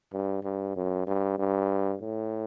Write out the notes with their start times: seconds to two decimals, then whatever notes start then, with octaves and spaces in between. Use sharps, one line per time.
0.13 G2
0.43 G2
0.76 F#2
1.07 G2
1.38 G2
2.02 A2